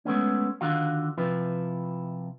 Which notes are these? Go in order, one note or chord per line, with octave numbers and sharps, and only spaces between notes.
G#3 A3 B3 C#4
D3 D#3 F4 F#4 F5
C3 F3 E4 F4 B4